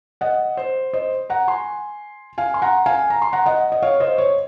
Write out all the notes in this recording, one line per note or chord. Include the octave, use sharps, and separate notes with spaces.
D#5 F#5
C5
C5 D#5
F#5 A#5
G#5 C6
F5 G#5
C6
F#5 A#5
F5 G#5
A#5
C6
F#5 A#5
D#5 F#5
D#5
C#5 F5
C5 D#5
C#5